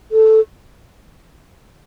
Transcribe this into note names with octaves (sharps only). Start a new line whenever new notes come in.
A4